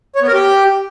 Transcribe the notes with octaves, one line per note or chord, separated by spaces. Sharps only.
C#5
B3
A#4
G4